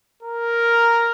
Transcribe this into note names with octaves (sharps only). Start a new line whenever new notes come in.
A#4